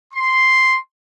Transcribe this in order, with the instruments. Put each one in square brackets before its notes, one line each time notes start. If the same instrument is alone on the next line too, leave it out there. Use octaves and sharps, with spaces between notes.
[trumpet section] C6